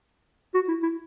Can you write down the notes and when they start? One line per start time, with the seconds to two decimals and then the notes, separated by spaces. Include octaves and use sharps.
0.54 F#4
0.68 E4
0.82 E4